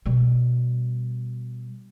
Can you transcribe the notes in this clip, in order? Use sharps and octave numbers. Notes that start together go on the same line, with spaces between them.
B2 G3